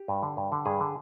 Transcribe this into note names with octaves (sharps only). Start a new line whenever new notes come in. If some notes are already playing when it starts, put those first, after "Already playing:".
Already playing: G4
G2
D3
G2
D3
G2 G#4
D3